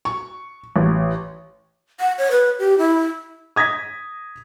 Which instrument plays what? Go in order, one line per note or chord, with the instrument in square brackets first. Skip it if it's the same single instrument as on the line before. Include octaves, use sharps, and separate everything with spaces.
[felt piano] C#6
A1
[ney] F#5
C#5
B4
G4
E4
[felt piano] D#6 G#6 A#6 B6